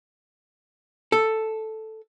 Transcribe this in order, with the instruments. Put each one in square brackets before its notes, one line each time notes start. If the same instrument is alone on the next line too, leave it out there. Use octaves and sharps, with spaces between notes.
[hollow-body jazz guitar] A4